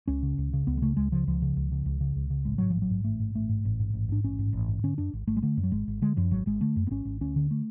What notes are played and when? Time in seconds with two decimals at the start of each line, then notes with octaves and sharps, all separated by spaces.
0.08 C#2 C#4
0.23 C#3
0.38 C#2
0.53 C#3
0.67 C#2 B3
0.77 G#3
0.82 C#3 A3
0.97 C#2 G#3
1.12 C#3 F3
1.27 C#2 F3
1.42 C#3
1.57 C#2
1.72 C#3
1.86 C#2
2.01 C#3
2.16 C#2
2.30 C#3
2.45 A1 G#3
2.58 G#2 F#3
2.70 A1 F3
2.82 F#3
2.91 G#2
3.04 A1 A3
3.20 G#2
3.35 A1 A3
3.49 G#2
3.65 A1
3.80 G#2
3.94 A1
4.09 G#2 D4
4.24 A1 C#4
4.39 G#2
4.53 A1
4.68 G#2
4.84 D3 C#4
4.98 F#2 D4
5.13 G#1
5.27 G#1 A3
5.36 G#3
5.42 D3 A3
5.57 F#2
5.63 F#3
5.72 G#1 G#3
5.87 G#1
6.02 D3 G#3
6.17 F#2 F3
6.31 G#1 F#3
6.46 G#1 G#3
6.61 D3 A3
6.76 F#2
6.87 B3
6.91 G#1 C#4
7.05 G#1
7.21 D2 C#4
7.36 D3
7.51 A3